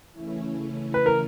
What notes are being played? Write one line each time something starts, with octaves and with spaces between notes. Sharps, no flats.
C#3 E3 A3 C#4 E4
B4
A#4